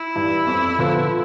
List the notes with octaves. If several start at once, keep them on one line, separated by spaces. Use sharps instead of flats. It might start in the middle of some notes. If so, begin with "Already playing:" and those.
Already playing: E4
G2 E3
F2
D3 F3 B3 F4